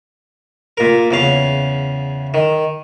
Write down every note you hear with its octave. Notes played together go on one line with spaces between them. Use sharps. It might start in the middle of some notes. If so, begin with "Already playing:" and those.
A#2 A#4
E2 C#3 F5
D#3